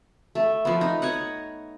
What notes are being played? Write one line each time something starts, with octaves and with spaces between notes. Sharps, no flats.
A3
F3 B3
D#4
C#5 D#5 F#5